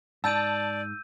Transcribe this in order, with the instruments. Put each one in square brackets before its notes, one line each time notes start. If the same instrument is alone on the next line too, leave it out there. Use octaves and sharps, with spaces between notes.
[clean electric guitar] G#2 [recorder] D5 [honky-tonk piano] A5 [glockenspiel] E6 G6 D#7